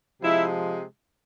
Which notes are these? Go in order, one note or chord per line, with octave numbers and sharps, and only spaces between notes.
C3 F3 G#3 E4